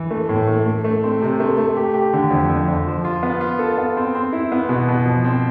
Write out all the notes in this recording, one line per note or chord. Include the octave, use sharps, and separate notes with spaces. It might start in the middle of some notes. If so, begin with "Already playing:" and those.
Already playing: E3
A3
A2
A3
A3
A3
C4
C3
A3
A3
G4
G4
D3
F2
F2
F2
F3
F4
B3
F4
A4
B3
C4
C4
E4
B3
B2
B2
F3
C4